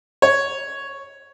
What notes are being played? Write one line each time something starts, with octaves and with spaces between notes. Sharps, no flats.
C#5